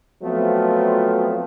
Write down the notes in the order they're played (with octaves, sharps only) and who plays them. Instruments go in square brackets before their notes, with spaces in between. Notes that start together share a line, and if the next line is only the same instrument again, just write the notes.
[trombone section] F3 F#3 A3 B3 C4 F4